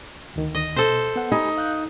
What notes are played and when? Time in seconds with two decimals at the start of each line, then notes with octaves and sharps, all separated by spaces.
0.36 D2 D#3
0.55 D#5
0.76 B2 A4 C5
1.16 B3 F#5
1.32 D#4 G4 G#5 B5
1.57 F5 F#6 G6